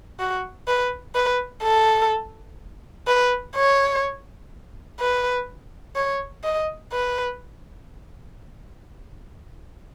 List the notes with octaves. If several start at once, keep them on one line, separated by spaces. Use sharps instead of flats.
F#4
B4
B4
A4
B4
C#5
B4
C#5
D#5
B4